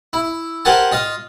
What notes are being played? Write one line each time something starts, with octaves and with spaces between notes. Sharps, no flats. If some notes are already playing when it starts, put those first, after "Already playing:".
E4
G4 A#4 C5 F#5 G#5 A5
F4 D#5 F5